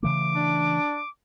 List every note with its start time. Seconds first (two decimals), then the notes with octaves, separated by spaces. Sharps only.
0.03 C#3 E3 A3 D6
0.34 D4